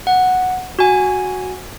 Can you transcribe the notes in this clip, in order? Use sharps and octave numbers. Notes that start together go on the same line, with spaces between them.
F#5
F#4 G#5